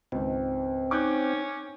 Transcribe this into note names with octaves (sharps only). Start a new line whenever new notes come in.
C#2 G#2 D#3 C4
C#4 D#4 D6 F#6 G6